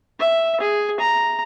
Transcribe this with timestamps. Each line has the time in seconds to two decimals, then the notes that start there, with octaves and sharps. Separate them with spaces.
0.19 E5
0.60 G#4
1.00 A#5